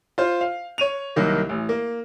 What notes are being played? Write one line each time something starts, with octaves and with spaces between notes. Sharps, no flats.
F4 C5
F5
C#5 D#7 F7
C2 D#3 F#3 A#3
A1
A#3